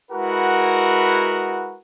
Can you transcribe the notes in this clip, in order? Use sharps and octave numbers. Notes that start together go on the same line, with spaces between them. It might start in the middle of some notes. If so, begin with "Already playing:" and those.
G#3 E4 F#4 A#4 B4 F#5